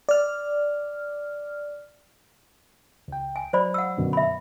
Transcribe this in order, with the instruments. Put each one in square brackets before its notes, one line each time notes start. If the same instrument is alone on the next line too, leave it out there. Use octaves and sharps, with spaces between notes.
[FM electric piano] D5 F6
[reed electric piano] C#2 G5
[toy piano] G#5
[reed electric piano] F#3 [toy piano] C5 D5 B5
[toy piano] F#5 E6
[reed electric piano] F#2 B2 D3
[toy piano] E5 B5